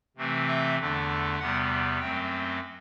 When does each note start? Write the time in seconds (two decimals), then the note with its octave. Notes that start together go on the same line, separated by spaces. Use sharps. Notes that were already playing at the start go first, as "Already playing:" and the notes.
0.17 C3 E3 A3 C4
0.48 E5
0.78 E2 D3 A3 D4
1.39 E2 C3 G3 B3 F#5
1.99 F#2 F#3 A3 C4 G5